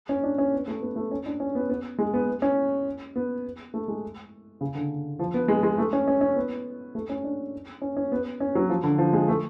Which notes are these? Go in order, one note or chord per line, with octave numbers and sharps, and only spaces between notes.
C#4
D4
C#4
B3
A3
B3
A3
C#4
D4
C#4
B3
B3
G#3
B3
C#4
B3
A3
G#3
C#3
D3
F3
B3
G#3
G#3
A3
C#4
C#4
C#4
B3
A3
C#4
D4
C#4
C#4
B3
C#4
F#3
F3
D3
F3
G#3
A3